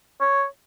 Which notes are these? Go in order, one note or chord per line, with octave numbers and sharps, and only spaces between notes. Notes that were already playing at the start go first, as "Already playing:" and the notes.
C#5